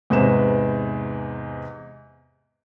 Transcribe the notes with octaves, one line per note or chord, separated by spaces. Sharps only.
E2 G#2 C3 B4 C5 E7